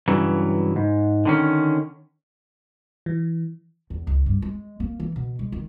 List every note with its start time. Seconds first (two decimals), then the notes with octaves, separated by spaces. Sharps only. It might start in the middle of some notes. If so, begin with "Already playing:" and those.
0.08 G2 C#3 E3 F#3
0.76 G#2
1.25 D3 D#3 C#4
3.06 E3
3.90 E2
4.07 C#2
4.26 G2
4.42 G#3
4.80 A#3
5.00 E3
5.16 B2
5.39 G#3
5.52 D#3